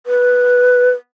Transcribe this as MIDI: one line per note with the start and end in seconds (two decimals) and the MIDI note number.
0.07 0.90 71